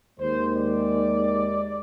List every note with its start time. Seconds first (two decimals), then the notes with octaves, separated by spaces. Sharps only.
0.20 D#2 D#3 G#3 C5
0.56 D5